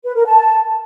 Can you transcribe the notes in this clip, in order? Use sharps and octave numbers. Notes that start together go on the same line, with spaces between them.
B4
A#4
A5